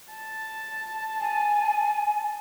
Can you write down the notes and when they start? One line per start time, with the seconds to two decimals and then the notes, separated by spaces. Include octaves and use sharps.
0.12 A5
1.21 G#5